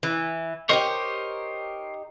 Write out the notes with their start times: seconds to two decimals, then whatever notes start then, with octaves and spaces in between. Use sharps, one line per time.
0.03 E3
0.69 D#4 F#4 G4 A#4 C5 C#5